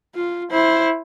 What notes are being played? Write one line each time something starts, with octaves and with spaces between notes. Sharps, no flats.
F4
E4 C5